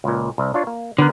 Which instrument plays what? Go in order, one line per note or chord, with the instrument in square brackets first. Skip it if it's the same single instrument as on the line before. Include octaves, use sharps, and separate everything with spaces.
[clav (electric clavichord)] C#2 A#2
C2
D4 F4 C#5
A#3
[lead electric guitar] D3 [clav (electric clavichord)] B3 A#4